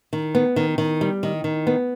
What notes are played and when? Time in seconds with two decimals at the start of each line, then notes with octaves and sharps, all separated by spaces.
0.13 D#3
0.35 B3
0.56 D#3
0.78 D#3
1.01 G3
1.23 D#3
1.44 D#3
1.67 B3